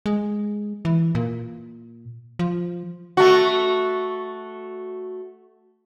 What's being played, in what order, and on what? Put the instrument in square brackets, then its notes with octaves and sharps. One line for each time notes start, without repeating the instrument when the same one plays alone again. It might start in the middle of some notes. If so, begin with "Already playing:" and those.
[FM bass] G#3
E3
A#2
F3
[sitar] A3 F#4